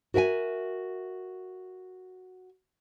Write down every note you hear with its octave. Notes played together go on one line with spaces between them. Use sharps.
F#4 A#4 E5 G5 G#5